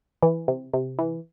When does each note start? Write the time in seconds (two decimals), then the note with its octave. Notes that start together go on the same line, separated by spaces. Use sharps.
0.23 E3
0.48 C3
0.74 C3
0.99 E3